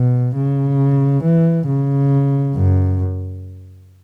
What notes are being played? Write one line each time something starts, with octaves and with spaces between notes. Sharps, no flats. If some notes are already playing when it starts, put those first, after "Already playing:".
Already playing: B2
C#3
E3
C#3
F#2